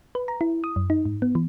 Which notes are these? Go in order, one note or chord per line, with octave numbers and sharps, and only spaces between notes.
B4
A#5
E4
D#6
F#2
D#4
G#2
B3
E3